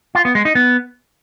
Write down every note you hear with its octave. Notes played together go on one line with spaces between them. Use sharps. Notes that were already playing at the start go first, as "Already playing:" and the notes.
F4
B3
G#3
D#4
B3